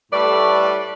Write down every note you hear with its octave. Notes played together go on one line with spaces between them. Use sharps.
A2 G3 A3 B4 D5